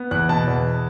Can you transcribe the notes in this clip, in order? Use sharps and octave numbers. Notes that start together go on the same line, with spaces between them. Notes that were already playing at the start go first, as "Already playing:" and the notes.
Already playing: B3
E2 F#6
B2 A5
E2